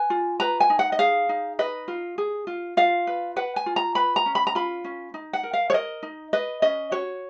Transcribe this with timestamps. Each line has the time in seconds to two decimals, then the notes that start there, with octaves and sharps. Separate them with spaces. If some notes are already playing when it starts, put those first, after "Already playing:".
Already playing: B4 G#5
0.10 F4
0.40 B4 A#5
0.60 G#5
0.70 D#4
0.79 F#5
0.92 D#5
0.99 G#4 F5
1.29 D#4
1.59 B4 D#5
1.88 F4
2.18 G#4
2.47 F4
2.77 F4 F5
3.07 B4
3.36 B4 F#5
3.56 G#5
3.66 F4
3.76 A#5
3.95 B4 B5
4.16 A#5
4.26 C#4
4.35 B5
4.47 A#5
4.55 F4 B5
4.84 C#4
5.14 D#4
5.33 F#5
5.43 A#4
5.53 F5
5.70 C#5
5.74 A#4 D#5
6.03 D#4
6.33 B4 D#5
6.62 C#4 D#5
6.91 F#4 C#5